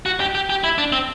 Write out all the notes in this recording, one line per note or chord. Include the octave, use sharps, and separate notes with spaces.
F#4
G4
G4
G4
E4
D4
C4